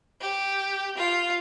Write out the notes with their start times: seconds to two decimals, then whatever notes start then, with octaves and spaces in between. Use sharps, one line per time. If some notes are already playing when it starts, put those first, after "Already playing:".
0.21 G4
0.97 F4